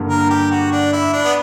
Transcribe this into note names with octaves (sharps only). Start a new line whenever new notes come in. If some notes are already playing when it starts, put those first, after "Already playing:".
Already playing: G2 D3 A#3
A#4
G4
F#4
D4
E4
D4
B3